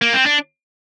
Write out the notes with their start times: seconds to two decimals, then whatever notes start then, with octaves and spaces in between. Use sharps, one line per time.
0.02 A#3
0.13 C4
0.26 D4